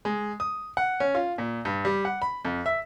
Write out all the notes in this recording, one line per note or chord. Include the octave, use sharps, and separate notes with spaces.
G#3
D#6
F#5
C#4
F4
A#2
G2
G3
F#5
B5
F2
E5